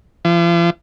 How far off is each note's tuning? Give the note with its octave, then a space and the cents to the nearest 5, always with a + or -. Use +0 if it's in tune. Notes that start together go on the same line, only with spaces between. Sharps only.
F3 -45